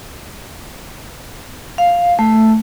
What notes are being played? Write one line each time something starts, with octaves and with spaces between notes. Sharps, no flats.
F5
A3